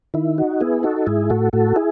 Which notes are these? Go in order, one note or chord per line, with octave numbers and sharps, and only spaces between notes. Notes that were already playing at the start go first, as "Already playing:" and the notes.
D#3 E4
D#4 F#4
B3 E4 G#4
D#4 F#4 A4
G#2 E4 G#4
A2 F#4 A4
A2 F#4 A4
E4 G#4